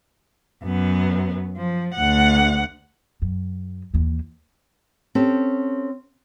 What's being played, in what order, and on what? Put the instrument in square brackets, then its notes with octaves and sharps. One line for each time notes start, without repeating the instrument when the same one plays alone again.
[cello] F#2 B3
F3
D2 F#5
[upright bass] F#2
D#2 E3
[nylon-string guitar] C4 C#4 G4 A4